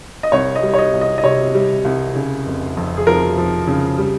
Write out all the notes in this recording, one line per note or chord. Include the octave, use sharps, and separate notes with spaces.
D#5
C2 C#5
D#5
G3
C#5
D#5
C2
D#5
D#5
C3 C#5
G3
C2
C#3
F1
F2
G#4
F3 A#4
F3
C#3
G3